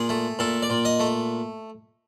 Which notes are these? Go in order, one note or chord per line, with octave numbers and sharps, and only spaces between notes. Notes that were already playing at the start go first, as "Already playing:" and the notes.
Already playing: A#2 G#4
A3
A#2 A4
D5
A#2
D#5
A3